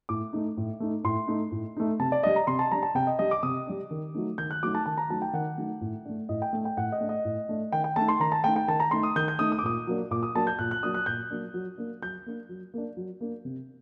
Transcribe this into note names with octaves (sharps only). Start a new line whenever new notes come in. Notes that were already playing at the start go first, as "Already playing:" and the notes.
A2 D6
A3 D#4
A2
A3 D#4
A2 C6
A3 D#4
A2
A3 D#4
C3 A5
D5
G3 D4 D#5
A#5
C3 C6
A5
G3 D4 A#5
A5
C3 G5
D#5
G3 D4 D#5
D6
C3 D#6
G3 D4
D#3
F#3 A3 D#4
D#3 G6
F#6
F#3 A3 D#4 D6
A5
D#3 A5
A#5
F#3 A3 D#4 A5
G5
D#3 F#5
F#3 A3 D#4
A2
A3 D4
A2 D#5
G5
A3 D4
G5
A2 F#5
D#5
A3 D4
D#5
A2
A3 D4
D#3 G5
G5
A3 D#4 A5
C6
D#3 A#5
A5
A3 D#4 G5
G5
D#3 A5
A#5
A3 D#4 C6
D#6
D#3 G6
G6
A3 D#4 D#6
D#6
D6
A#2 D#6
F#3 A#3 D4
A#2 D6
D#6
F#3 A#3 D4 A5
G6
A#2 F#6
F#6
F#3 A#3 D4 D#6
F#6
A#2 G6
F#3 A#3 D4
F#3
A#3 D4
F#3 G6
A#3 D4
F#3
A#3 D4
F#3
A#3 D4
C3